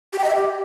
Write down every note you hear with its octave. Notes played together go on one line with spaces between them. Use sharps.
G4
G5
D#5
E5
G4